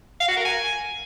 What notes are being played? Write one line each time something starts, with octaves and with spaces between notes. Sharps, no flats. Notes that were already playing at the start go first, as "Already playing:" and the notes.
F5
F#4
A#4
G#5